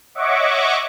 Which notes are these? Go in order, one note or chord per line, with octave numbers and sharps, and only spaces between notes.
C#5 D#5 E5 F#5 C#6 D6